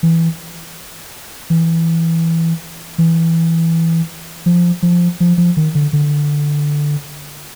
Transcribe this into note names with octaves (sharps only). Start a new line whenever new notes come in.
E3
E3
E3
F3
F3
F3
F3
D#3
D3
D3